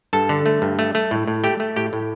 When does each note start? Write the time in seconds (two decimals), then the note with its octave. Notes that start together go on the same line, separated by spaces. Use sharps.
0.13 G2 A4 A5
0.29 D3
0.46 A3
0.62 G2
0.79 A3
0.95 A3
1.11 A2
1.27 A2
1.44 A3 G4 G5
1.60 A3
1.76 A2 G4 G5
1.93 A2